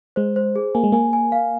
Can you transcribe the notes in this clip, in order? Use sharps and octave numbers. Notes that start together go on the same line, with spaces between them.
G#3 C5
C5
G#4
A#3 G#5
G#3
A#3 G#5
G#5
F5